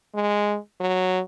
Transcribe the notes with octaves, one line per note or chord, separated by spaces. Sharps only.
G#3
F#3